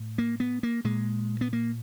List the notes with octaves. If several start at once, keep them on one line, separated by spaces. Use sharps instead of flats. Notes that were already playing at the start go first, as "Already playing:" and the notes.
Already playing: A2
A#3
B3
A#3
A#2 G#3
B3
A#3